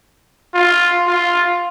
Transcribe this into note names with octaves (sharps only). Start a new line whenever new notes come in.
F4
F4